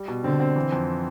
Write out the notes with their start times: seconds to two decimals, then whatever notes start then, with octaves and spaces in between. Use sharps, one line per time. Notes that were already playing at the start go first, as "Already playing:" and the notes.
Already playing: G3
0.08 B2
0.24 D3 C4
0.40 C4
0.56 E3
0.72 F2